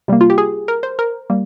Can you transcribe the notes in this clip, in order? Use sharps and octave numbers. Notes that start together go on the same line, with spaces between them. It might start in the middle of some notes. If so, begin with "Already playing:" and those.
C3 G3 A#3
F4
G4
G#4
A#4
C5
A#4
G3 A#3